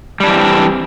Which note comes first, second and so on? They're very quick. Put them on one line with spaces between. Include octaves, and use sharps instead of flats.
G3 D4 E3 C4